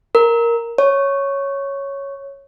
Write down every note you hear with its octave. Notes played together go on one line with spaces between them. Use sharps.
A#4
C#5